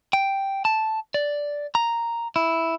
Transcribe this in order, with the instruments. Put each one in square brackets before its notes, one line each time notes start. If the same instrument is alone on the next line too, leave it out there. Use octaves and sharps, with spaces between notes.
[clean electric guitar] G5
A5
D5
A#5
E4